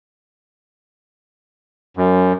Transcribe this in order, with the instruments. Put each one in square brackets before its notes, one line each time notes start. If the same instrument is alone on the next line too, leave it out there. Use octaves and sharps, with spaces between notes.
[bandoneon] F#2